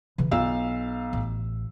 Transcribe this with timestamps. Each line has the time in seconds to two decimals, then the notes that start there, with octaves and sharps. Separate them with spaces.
0.18 C#3 E3
0.31 B1 F4 F5 E6
1.13 A1